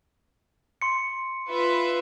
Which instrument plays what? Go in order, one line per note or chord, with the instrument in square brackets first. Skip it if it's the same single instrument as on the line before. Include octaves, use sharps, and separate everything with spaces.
[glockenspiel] C6 C#7
[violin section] F4 B4 E5